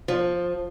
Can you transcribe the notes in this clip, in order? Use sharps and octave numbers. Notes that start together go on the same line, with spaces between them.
F3